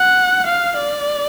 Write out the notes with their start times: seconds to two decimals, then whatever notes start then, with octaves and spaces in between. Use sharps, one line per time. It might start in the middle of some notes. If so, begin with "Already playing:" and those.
Already playing: F#5
0.47 F5
0.77 D5